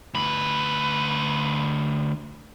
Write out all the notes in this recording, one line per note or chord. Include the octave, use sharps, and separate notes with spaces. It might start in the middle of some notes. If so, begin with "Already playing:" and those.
D2 B4